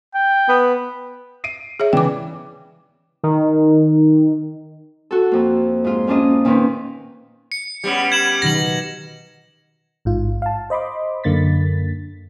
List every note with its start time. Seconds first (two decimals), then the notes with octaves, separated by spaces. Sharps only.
0.15 G5
0.49 B3
1.44 C7 D7 D#7
1.80 G#4 C#5 E5
1.93 C#3 E3 D5 G5 D6
3.23 D#3
5.11 F#4 A4
5.32 F2 A#3
5.84 G#2 F4
6.07 A#3 C#4 D4 F4 D#5
6.45 A#2 D#3 C4 C#4 B4
7.52 C#7
7.84 G3 B3 C#4
8.12 G#6 E7 F#7
8.42 B2 D#3 F#3 A#6 F#7
10.05 A1 G#2 F4
10.42 F5 A5
10.70 C5 D#5 B5 C6 D6
11.24 F#2 D3 A#3 A6 B6